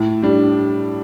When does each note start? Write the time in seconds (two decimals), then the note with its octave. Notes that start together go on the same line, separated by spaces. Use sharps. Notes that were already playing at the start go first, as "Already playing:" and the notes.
Already playing: A2
0.22 G3 D4